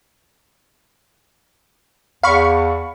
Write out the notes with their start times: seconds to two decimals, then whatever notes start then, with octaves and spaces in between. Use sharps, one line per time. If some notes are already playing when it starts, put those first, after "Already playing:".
2.23 E2 F5 B5 C#6